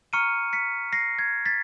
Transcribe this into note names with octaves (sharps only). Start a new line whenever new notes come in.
A#5 C#6 F6 C#7 D#7
B6 C#7
A#6 C7
G#6
A6 B6